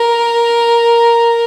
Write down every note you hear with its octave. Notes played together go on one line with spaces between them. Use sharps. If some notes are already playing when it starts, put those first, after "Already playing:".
Already playing: A#4